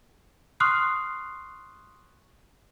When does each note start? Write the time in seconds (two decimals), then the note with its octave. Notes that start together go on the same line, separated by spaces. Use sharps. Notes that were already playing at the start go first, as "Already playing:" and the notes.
0.60 C6 C#6 D#6 F6 F#6 C7